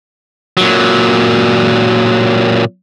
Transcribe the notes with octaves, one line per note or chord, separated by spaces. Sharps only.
A#2 F#3